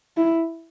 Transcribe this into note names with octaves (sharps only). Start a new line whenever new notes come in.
E4